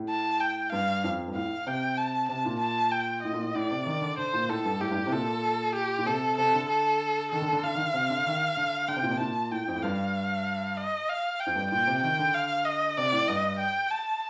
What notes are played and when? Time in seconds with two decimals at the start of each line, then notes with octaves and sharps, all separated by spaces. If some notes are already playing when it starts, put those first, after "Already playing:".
Already playing: A2
0.10 A5
0.40 G5
0.72 G2 F5
1.04 F2
1.28 G2
1.35 A2 F5
1.67 C3 G5
1.97 A5
2.29 C3 A5
2.45 A#2
2.60 A5
2.92 G5
3.23 A2 D#5
3.33 A#2
3.43 A2
3.55 A2 D5
3.71 C3
3.86 D#3
4.02 D3
4.18 D3 C5
4.33 A#2
4.49 A2 A4
4.65 G2
4.80 A2 G4
4.91 G2
4.96 A2
5.07 C3
5.12 A#2 A4
5.75 G4
5.98 A#2
6.06 C3 A4
6.38 C3 A4
6.54 D3
6.69 A4
7.32 D#3 A4
7.42 D3
7.53 D3
7.64 D3 F5
7.75 D#3
7.78 D3
7.94 C3
8.10 D3
8.26 D#3
8.57 D3
8.88 D3 G5
8.96 C3
9.03 A#2
9.11 C3
9.20 A#2 A5
9.51 A2 G5
9.68 F2
9.75 A2
9.83 G2 F5
10.77 D#5
11.09 F5
11.40 G5
11.46 F2
11.56 G2
11.71 A#2 G5
11.87 C3
12.03 D#3 G5
12.19 D3
12.34 F5
12.65 D#5
12.97 C3 D5
13.12 A2
13.28 G2 D#5
13.59 G5
13.91 A5